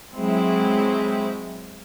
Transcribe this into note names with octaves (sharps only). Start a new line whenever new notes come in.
F#3 G#3 C4 E4